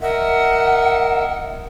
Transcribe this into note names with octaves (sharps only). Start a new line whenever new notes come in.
A#4 D#5 E5 F#5